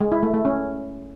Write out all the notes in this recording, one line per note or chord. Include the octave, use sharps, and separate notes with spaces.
G#3
E4
A3
A3
C#4